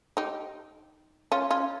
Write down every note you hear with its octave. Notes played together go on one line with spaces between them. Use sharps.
D#4 G4
C#4 F4
C#4 F4